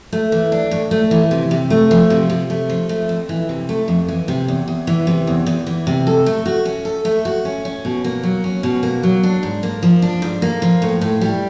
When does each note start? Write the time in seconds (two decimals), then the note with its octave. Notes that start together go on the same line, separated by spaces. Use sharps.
0.13 A3
0.32 E3
0.52 D4
0.71 A2
0.91 A3
1.11 E3
1.31 C3
1.51 C3
1.70 A3
1.91 F3
2.10 C3
2.30 C3
2.50 A3
2.69 F3
2.89 A3
3.09 F2
3.29 E3
3.49 C3
3.69 A3
3.88 F2
4.08 E3
4.28 C3
4.48 E2
4.68 E2
4.87 E3
5.07 C3
5.27 E2
5.46 E2
5.67 E3
5.87 C3
6.07 A4
6.26 A3
6.46 F#4
6.65 C#4
6.85 A4
7.05 A3
7.25 F#4
7.45 C#4
7.65 C#4
7.85 B2
8.04 A#3
8.23 F#3
8.44 C#4
8.63 B2
8.83 A#3
9.03 F#3
9.23 D4
9.43 G#2
9.63 A#3
9.83 F3
10.02 D4
10.22 G#2
10.42 A#3
10.62 F3
10.82 A2
11.01 A2
11.21 G3